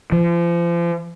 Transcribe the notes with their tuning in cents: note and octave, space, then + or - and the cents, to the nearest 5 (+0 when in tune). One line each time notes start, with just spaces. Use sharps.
F3 -35